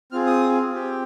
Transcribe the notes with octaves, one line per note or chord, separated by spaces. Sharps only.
C4 F4 G#4 F6
D#6
C4 G4